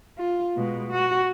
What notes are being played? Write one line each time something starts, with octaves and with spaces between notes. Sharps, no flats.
F4
B2 G#3
F#4